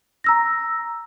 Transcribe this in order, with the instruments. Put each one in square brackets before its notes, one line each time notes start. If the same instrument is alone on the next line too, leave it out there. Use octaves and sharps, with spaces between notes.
[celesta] A#5 E6 A#6